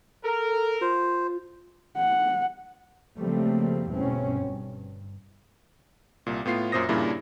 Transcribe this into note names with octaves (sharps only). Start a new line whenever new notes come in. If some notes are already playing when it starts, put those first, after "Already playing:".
A4 A#4
F4 C5
F#5
C#3 F3 G3 A3 A#3 C4
G1 E2 B2 C4 C#4
G2
C2 A#2
A2 B3 F4 C7
F#2 A#2 C5 D#6 A#6
G2 A#2 C#3 A#3 D4 E4